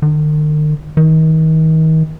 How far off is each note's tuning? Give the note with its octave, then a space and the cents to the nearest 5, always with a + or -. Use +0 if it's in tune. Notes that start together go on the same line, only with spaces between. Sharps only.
D#3 -45
D#3 +35